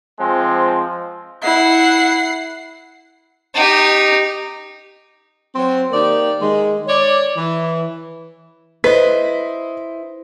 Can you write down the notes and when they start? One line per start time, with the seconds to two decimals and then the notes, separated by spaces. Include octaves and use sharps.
0.19 F3 G#3 C4
1.43 E4 F#5 C7
3.54 D#4 G4
5.55 F#3 C4
5.91 D#3 A#3 G4 D5
6.41 D#3 G#3
6.87 C#5 D5
7.37 E3
8.84 E4 B4 C5 D#5 B6